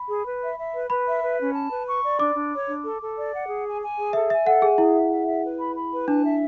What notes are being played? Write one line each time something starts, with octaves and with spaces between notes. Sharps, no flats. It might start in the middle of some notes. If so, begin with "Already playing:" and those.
Already playing: B5
G#4
B4
E5
E5
B4
B4 B5
E5
B4
C#4
A5
B4
C#6
D5
D4 D6
D4
C#5
D4
A4
A4
D5
F#5
G#4
G#5
G#5
G#4
A4 E5
E5 G#5
A4 F#5
G#4 G#5
E4 G#4
E5
E5
E5
B4
B5
B5
B4
D4 A5
E5